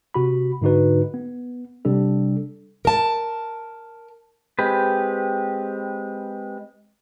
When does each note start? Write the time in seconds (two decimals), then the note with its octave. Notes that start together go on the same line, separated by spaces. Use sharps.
0.14 C3 F#4 B5
0.62 G#2 D3 D#4 F#4 B4
1.14 B3
1.85 C3 G3 D4 A4
2.85 A#4 A5
4.59 G#3 C4 G4 B4